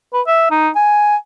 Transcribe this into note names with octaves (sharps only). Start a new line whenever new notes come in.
B4
E5
D#4
G#5